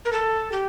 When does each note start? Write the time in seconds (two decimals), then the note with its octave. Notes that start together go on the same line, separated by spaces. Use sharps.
0.05 A#4
0.13 A4
0.52 G4